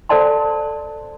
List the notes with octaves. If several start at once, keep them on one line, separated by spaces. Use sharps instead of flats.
A4 C5 D5 A5 C6